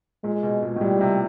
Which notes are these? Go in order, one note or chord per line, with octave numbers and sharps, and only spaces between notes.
A#2 G#3
B2
A#2
A2
A#2 G3
C3